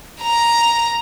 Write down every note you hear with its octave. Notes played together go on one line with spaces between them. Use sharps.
A#5